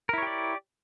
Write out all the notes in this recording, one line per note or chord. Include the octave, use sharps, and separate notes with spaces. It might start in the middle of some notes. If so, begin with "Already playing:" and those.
E4 G4 A#4 C#5 D5